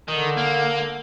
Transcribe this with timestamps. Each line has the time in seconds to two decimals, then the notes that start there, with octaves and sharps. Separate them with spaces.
0.08 D3 D#3
0.37 A#3